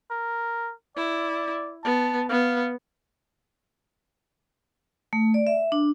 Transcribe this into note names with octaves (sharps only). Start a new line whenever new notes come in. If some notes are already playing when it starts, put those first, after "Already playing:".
A#4
E4 D5
B3 A5
B3 F5
A3
D5
E5
D4